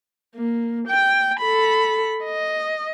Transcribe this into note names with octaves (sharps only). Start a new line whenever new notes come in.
A#3
G5
A4 B5
D#5